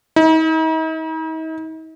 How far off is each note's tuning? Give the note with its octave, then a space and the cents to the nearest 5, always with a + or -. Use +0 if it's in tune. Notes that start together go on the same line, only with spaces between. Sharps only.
D#4 +45